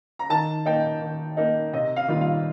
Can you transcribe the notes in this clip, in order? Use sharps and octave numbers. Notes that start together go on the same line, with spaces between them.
A#5
D#3 A5
A#3 D#4 G5
D#3
A#3 D#4
C3 D#5
F5
D#3 G3 A#3 F4
F5